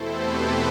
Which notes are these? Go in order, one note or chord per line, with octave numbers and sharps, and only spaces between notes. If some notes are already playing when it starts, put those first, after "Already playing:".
Already playing: E2 B2 A3 C4 E4 A4 C5
G4 B4